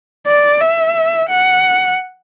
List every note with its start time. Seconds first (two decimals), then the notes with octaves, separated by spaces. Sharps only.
0.27 D5
0.60 E5
1.29 F#5